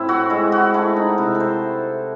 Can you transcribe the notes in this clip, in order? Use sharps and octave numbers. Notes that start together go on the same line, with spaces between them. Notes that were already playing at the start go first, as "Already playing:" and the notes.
Already playing: A2 C4 E4 A4
F#4
G#3 E4
F#4
A3 E4
D#4
C3 E4
A4
C5